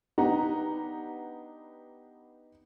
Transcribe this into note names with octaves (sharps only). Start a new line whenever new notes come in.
B3 D4 D#4 G4 F#5 A#5